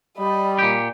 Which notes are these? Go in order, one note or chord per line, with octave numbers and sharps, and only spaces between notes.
G3 D#5 B5
A#2 G4